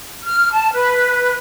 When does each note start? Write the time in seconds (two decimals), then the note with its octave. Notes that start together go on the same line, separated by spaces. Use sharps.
0.24 F6
0.52 A5
0.73 B4